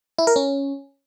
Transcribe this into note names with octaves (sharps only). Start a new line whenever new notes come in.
E4
A#4
C#4